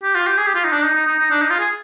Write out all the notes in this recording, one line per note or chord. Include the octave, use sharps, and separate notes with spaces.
G4
F4
G4
G#4
G4
F4
D#4
D4
D#4
D#4
D#4
D#4
D4
D#4
F4
G#4